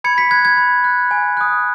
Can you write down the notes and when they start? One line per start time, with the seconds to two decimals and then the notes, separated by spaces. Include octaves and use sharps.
0.04 B5 G#6 C#7
0.18 B6
0.31 F#6 G#6
0.45 G#6
0.57 B5
0.84 F#6
1.11 G#5
1.37 D#6 F#6